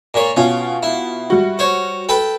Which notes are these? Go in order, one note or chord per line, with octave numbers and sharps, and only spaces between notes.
A#2 C#5
B2 C#4 F4
E4
G3 F#4
C5 C#5
A4 B4 G5